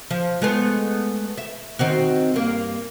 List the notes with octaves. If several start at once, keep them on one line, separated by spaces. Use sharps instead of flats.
F3
G#3 A3 B3
E5
D#3 C4 F#4
G2 A#3